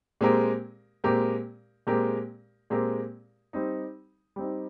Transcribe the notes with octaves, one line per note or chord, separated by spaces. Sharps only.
A#2 G#3 C4 G4 A#4
A#2 G#3 C4 G4 A#4
A#2 G#3 C4 G4 A#4
A#2 G#3 C4 G4 A#4
G3 C4 D#4
G3 C4 D#4